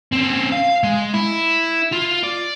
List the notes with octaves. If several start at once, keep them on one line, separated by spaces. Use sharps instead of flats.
C4 C#4
F5
G#3
E4
F4
D5